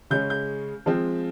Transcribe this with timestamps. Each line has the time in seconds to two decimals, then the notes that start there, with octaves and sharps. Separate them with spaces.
0.10 C#3 G#3 C#4 G6
0.30 G6
0.86 F3 G#3 C4